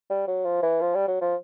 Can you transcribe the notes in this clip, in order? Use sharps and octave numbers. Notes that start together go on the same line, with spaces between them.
G3
F#3
F3
E3
F3
G3
F#3
F3